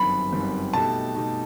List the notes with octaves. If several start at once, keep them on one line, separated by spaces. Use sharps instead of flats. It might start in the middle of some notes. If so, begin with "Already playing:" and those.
Already playing: G1 F#2 D#3 G3 C4 B5
G1 F#2 D#3 G3 C4
B2 A3 D#4 G4 A5
B2 A3 D#4 G4